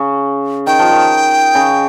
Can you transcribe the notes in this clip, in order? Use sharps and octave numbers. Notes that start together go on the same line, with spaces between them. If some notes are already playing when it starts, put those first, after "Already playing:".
Already playing: C#3
D#3 G5
F3
D#3
C#3